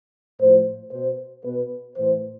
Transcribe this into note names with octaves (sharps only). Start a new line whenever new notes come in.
A2 F3 C5
B2 C5
B2 B4
A2 E3 C5